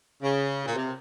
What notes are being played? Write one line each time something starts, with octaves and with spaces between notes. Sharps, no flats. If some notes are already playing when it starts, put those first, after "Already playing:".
C#3
A#2
C3